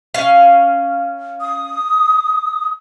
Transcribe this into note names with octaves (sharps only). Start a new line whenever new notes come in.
C#4 F5
D#6